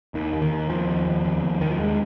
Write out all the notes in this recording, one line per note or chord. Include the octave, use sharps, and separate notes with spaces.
D#2 D#3
D#2
D#3
D#2
D#2 F3
D#2
D#2
D#2
D#2
D#2 D#3
F3
D#2 G#3